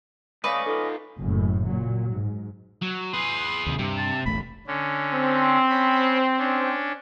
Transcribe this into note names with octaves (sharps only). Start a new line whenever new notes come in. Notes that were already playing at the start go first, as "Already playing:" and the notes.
A3 C#4 B4 D5 D#5 F5 C#6 D#6
D#4 F4 A4
F#1 F#2 A2
A#2 F#3
G#2
F#3
G#4 B4 C6
D#2 C3
G2 C3
A5
E1 A1 A3 B5
D3 C#4
C4
C#4 B5
C#4 D4